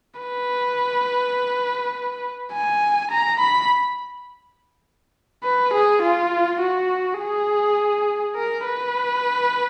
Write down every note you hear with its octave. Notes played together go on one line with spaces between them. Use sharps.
B4
G#5
A#5
B5
B4
G#4
F4
F#4
G#4
A#4
B4